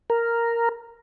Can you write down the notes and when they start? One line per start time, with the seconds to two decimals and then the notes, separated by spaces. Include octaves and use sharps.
0.10 A#4